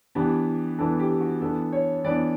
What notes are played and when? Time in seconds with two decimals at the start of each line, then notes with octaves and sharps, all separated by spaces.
0.15 E3 B3 D4 G4
0.79 E3 B3 D4 A4
0.99 G4
1.20 F#4
1.41 E3 B3 D4 A4
1.73 C#5
2.04 E3 B3 D4 D5